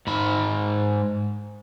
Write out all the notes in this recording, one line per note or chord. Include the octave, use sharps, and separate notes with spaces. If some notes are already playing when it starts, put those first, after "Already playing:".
G#2 B5